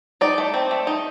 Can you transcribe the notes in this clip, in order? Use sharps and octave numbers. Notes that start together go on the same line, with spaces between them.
D#4 D5
A3
C4
A3
D#4